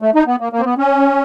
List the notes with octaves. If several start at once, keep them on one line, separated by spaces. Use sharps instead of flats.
A3
D#4
B3
A#3
A#3
C4
B3
C#4